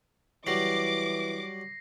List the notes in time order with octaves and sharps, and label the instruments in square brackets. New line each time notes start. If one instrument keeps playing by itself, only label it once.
[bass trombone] E3 [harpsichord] F#3 G3 [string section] D6 [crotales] A#6 C7